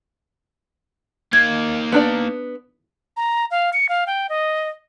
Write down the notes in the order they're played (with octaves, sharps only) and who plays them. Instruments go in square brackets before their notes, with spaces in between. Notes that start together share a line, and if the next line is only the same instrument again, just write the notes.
[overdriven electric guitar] A#3 D#4 [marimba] G#6
[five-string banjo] B3 D4 D5
[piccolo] A#5
F5
C#7
F5
G5
D#5